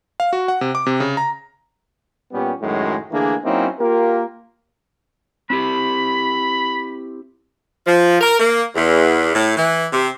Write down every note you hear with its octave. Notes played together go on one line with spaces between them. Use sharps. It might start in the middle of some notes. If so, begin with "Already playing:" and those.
F5
F#4
F#5
C3
D6
C3
C#3
A#5
A#2 G3 B3 C#4 G4
F#2 A2 D#3 F#3 G#3
D3 E3 A3 A#3 D4 G#4
F#3 A#3 C4 C#4 D#4 E4
A#3 F4 G4 A#4
C4 E4 G4 B5
F3
A#4
A#3
E2
A2
E3
C3